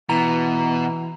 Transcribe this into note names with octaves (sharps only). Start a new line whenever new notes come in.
B2 E3 A#5